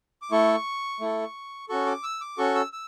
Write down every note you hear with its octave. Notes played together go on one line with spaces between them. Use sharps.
D6
A3 E4 A4 C#6
A3 E4 A4
C#4 F#4 A4 C#6
D6
E6
D6
C#4 F#4 A4 C#6
E6
E6